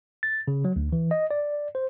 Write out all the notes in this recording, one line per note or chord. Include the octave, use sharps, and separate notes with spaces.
A6
C#3
F#3
D2
E3
D#5
D5
C5